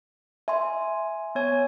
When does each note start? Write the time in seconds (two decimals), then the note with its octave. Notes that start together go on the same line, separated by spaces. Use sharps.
0.48 E5 G#5 C6
1.35 B3 C#5 G#5